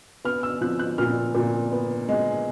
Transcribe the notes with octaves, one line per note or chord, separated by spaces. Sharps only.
B3 F6
E6
F3 F#6
F#6
A#2 F6
A#2
B3
G#3